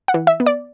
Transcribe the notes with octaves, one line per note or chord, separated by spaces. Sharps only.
F#5
E3
E5
B3
D5